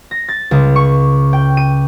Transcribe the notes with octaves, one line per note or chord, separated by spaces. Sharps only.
A#6
A6
C#2
C#6
G5
D#7